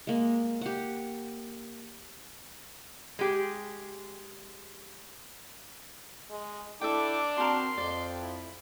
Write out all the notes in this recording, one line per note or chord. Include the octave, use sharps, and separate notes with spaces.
G#3 A#3
G4 F#5
G#3 G4 G#4
G#3
D4 E4 A4 E5 G5 D6
C4 F#4 A#4 A5 C6
F2 F3 D5
E4